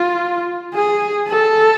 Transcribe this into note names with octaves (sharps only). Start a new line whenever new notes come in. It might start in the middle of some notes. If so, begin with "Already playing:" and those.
Already playing: F4
G#4
A4